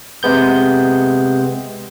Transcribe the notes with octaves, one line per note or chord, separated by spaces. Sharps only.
C3 G#3 B3 G6